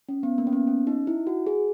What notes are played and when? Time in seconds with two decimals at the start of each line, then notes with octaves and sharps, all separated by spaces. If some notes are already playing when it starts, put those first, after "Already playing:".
0.09 C#4
0.23 B3
0.38 A#3
0.47 C#4
0.53 B3
0.67 C#4
0.87 D#4
1.07 E4
1.27 F#4
1.47 G#4